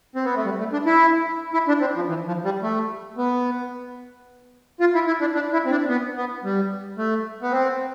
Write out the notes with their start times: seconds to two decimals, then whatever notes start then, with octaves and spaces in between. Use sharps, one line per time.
0.16 C4
0.25 B3
0.36 A3
0.45 G3
0.59 A3
0.73 D4
0.86 E4
1.53 E4
1.68 D4
1.81 C4
1.95 F3
2.09 E3
2.27 F3
2.45 G3
2.63 A3
3.18 B3
4.80 F4
4.95 E4
5.07 E4
5.21 D4
5.35 D4
5.53 E4
5.66 C4
5.71 D4
5.89 B3
6.17 B3
6.44 G3
6.98 A3
7.42 B3
7.52 C4